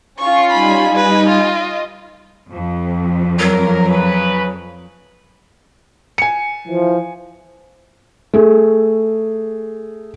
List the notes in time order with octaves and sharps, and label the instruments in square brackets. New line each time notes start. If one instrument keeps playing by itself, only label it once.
[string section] C#4 F4 [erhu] C#6
[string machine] G3 D#4 G#5 [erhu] B5
[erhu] B4 [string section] D#5
[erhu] F4
[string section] F2
[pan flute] F#3 [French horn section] A#4
[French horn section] C#3 B4
[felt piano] G#5 C#7
[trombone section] E3 F3
[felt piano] A3 G#4